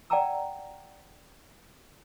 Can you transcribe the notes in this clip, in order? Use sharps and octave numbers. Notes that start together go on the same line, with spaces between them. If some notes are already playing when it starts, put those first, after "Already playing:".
D5 F#5 G5 A5 A#5 E6